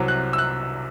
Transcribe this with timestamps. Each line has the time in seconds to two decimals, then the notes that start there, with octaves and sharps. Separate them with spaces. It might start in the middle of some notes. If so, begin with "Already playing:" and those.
Already playing: C2 C3 F#3
0.08 F#6
0.33 E6
0.38 F#6